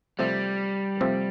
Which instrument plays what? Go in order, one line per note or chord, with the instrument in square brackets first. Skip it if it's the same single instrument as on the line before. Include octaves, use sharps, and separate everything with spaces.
[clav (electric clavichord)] C3 F3 A3 C4 [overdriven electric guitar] G3
[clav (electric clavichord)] C3 F3 A3 C4